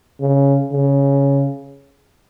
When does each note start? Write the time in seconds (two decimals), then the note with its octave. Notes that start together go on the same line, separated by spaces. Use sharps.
0.20 C#3
0.72 C#3